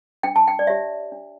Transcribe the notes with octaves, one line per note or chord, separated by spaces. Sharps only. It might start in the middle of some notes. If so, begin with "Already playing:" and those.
D4 G5
A5
G5
D5
G4 C#5 E5
D4